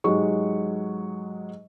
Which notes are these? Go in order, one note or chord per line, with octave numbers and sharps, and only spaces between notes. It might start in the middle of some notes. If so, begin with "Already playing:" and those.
G#2 F#3 G#3 G4 C#6